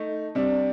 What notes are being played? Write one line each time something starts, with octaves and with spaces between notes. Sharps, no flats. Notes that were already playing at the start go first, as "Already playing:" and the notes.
Already playing: A3 D#4
C3 G3 D4